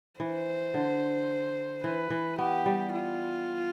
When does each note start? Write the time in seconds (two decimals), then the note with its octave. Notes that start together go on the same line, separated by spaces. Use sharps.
0.20 E3 C5
0.74 D3
1.84 E3 B4
2.10 E3
2.38 B3 G4
2.66 G3
2.93 F4